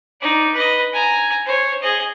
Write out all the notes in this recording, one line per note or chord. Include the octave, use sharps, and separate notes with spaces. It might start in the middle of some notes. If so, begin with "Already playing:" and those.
D#4 D5
B4 D#5
G#5 A#5
C5 C#5
G#4 D#5